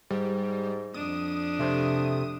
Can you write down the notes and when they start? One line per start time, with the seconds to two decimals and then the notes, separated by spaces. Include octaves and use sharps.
0.11 G#2 G3
0.94 F2 D4 D#6
1.59 C3 A3